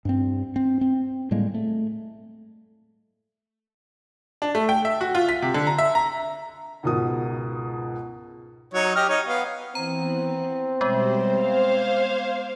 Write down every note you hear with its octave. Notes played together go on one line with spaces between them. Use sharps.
G2 C4
C4
C4
A2 G3 G#3 A#3
A3
D4
A3
G5
E5
F#4
F4
B6
C3
D3
A#5
E5
A#5
C#2 G#2 B2 A#4 D#6
F#3 D#4 C#5
G4 D#5 F6
D#4 C#5
B3 F5
E3 B3 C4 A#5
B2 G3 G#3 B3 C5
C5 F5 D6 G#6